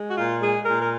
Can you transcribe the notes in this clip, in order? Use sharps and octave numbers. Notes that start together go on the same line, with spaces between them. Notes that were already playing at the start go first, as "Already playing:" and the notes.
Already playing: G#3
F#4
A#2 F4
G#3 G#4
A#2 A#4
A#4